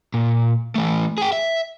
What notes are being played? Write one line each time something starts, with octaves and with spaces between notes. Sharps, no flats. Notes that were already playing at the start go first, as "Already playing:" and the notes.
A#2
E3 A3
G#4 G5
E5